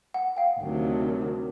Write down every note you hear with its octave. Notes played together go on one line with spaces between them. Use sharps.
F#5
F5 G5
D2 C3 D#3 F#3